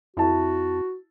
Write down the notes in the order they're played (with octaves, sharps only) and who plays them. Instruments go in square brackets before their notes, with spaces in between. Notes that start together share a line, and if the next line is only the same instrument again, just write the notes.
[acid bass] F2 [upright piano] E4 A5 [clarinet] F#4